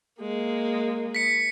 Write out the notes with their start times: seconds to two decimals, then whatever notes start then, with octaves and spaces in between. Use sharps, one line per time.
0.21 G#3 A#3
1.15 B6 C#7